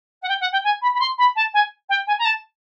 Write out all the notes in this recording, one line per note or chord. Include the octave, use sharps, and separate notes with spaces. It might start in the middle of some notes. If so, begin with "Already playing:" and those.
F#5
G5
F#5
G5
G#5
B5
B5
C6
B5
A5
G#5
G5
G#5
A#5
A5